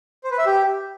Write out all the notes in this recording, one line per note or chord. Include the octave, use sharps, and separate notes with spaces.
C5
B4
E5
G4